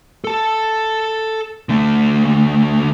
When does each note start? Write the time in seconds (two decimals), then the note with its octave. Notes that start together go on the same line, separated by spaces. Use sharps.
0.24 A4 A5
1.69 D3 A3